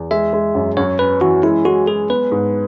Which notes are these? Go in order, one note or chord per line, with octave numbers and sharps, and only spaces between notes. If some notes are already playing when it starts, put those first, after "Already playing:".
Already playing: E2
G#3 E5
G#3
F#2
F#2 C#5
C#4 B4
E3 F#4
G#3 E4
G#3 F#4
G#3 G#4
B3 B4
G#2